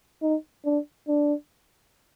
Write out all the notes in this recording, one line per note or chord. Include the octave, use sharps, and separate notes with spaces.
D#4
D4
D4